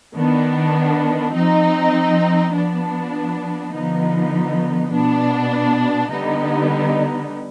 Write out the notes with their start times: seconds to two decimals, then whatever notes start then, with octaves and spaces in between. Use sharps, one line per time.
0.16 D#3 B3 D4
1.34 F3 C4 D#4
2.53 F3 B3 D4
3.72 D3 F3 B3 D#4
4.92 B2 B3 D4
6.11 D3 G3 B3 D#4